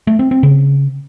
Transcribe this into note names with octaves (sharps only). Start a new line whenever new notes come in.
A3
C4
C4
C#3